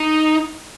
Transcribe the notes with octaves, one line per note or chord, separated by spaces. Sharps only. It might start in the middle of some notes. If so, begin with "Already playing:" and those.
Already playing: D#4